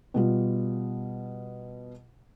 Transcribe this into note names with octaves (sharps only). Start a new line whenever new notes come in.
B2 G3 F4